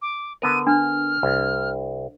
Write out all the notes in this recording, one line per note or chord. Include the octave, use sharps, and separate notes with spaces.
D6
D3 B3 A#4 D#7
D4 F6
C2